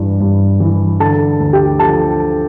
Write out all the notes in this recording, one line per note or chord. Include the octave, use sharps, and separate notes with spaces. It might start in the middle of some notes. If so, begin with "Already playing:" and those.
Already playing: G2 E3
G2
E3
D3 A4 A5
D2
G4 G5
F3 A4 A5